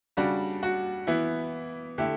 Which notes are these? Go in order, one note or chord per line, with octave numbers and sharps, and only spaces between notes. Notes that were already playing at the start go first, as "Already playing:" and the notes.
C#3 G3 D4 F#4
F#4
E3 B3 E4
D3 A3 E4 G4